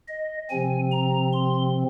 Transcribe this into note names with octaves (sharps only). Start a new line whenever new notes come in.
D#5
C3 F3 C4 G#5
A#5
C6